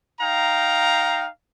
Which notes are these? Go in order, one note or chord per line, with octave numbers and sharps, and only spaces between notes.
D#4 F5 G5 A#5